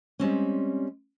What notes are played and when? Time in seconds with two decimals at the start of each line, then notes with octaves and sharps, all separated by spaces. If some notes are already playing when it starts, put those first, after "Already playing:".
0.20 G3 G#3 C4 C#4